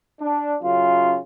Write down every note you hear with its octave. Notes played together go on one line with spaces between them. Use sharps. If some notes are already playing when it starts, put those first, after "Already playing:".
D4
F#2 C#3 F4